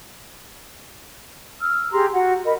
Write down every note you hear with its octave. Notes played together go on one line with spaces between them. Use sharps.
E6 F6
G4 G#4 A#5 C6
F#4 F#5
A#4 D#5 B5